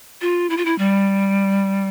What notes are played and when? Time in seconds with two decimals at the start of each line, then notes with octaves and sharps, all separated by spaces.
0.21 F4
0.50 E4
0.57 F4
0.65 E4
0.78 G3